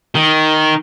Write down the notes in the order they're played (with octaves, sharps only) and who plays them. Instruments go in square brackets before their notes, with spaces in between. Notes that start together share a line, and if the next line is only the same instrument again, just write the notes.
[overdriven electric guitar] D#3